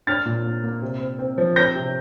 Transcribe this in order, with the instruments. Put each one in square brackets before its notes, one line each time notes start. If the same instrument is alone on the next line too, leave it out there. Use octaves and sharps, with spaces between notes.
[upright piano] D4 F6 A6
A#2
A#3
A#3
C3
C4
C4
F3
C4 G6 A#6
C3